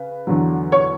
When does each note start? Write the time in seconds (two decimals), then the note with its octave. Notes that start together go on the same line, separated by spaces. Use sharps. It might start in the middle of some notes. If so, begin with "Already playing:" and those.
Already playing: C#3 B4
0.27 E2 D3 F#3
0.72 C#5 C#6